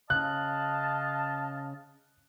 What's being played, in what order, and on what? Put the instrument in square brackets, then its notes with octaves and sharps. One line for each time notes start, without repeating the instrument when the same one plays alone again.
[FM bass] C#3 [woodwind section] D#5 F5 A5 [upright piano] F#6